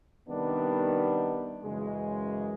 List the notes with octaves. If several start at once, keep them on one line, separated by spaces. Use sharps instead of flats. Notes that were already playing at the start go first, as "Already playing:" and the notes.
C3 D#3 G3 B3 D4
F#2 C#3 E3 G#3